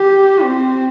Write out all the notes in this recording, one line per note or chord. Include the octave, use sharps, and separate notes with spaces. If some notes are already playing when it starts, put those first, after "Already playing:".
Already playing: G4
C4